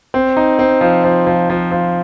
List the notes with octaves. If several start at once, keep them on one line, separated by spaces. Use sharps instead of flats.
C4
D#4
C4
F3
F3
F3
F3
F3